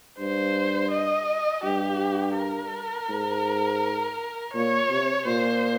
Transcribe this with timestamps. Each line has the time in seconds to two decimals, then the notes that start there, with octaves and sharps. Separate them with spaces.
0.19 G2 C5
0.91 D#5
1.64 G2 G4
2.37 A#4
3.09 G#2
4.54 A#2 C#5
4.90 C3
5.26 A#2 C5